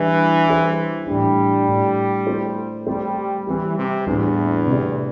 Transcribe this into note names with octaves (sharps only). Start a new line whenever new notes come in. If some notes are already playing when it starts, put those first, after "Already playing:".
Already playing: E3 G3 D4 G4 D5
G3 E4 G4 C5
A2 E3 G3 A3 D4
A2 A3 D4
A3 C4 E4 C5
G3 A3 C4 A4 C5
E3 G3 C4 G4
C3
E2 A2 E3 G3 D4
C3 A3 C4 G4 D5